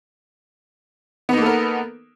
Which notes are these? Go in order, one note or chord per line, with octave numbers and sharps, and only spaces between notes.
A#3 B3 D#4 A4 A#4